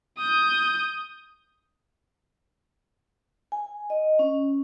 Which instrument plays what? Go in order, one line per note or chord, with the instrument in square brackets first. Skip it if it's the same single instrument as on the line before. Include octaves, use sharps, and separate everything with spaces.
[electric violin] D#6 G6
[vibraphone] G#5
D#5
C#4